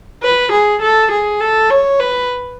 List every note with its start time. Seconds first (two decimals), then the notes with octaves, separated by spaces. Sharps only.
0.23 B4
0.52 G#4
0.81 A4
1.11 G#4
1.41 A4
1.70 C#5
2.00 B4